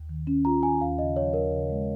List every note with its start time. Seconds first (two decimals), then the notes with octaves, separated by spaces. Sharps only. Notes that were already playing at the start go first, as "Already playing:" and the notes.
Already playing: D#2
0.09 D#3
0.27 C#4
0.45 F4 A#5
0.63 D#3 G#5
0.81 D#2 F5
0.99 C#3 D#5
1.16 F3 C#5
1.33 D#2 A#4
1.52 C#3
1.70 G#3